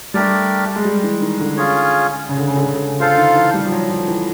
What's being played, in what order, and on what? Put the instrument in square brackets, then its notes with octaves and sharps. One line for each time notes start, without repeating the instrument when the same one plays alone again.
[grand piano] G3 [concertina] A3 D4 G4 A#4 D5
[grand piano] G#3
G3
E3
D#3
D3
[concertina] C#4 F4 G#4 C#5
[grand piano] C#3
D3
C#3
D3
C#3
D3
C#3
[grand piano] D3 [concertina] F4 A4 C5 F5
[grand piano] D#3
E3
G3
F3
F#3
F3
E3